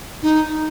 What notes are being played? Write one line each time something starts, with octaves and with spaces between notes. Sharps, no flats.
D#4